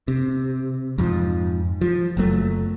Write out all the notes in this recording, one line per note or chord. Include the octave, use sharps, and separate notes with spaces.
C3
F2 G#2 F3
F3
F#1 F#3 A3